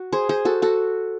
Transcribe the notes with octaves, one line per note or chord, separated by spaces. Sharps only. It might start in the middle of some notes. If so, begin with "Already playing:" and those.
Already playing: F#4
G#4 C5
G#4 C5
F#4 A4
F#4 A4